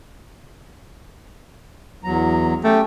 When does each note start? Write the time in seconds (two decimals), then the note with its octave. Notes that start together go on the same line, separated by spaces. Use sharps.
2.04 E2 F#3 A#5
2.64 A3 C#4 G4 G5